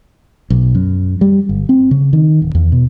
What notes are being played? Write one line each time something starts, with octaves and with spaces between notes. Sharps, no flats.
B1
F#2
G3
G1
C4
C#3
D#3
D1
E2
B2